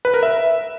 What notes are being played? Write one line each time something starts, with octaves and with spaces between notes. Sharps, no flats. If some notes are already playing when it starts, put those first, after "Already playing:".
B4
A#4
E5